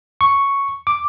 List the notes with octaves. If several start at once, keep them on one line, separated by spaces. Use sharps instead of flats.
C#6
D6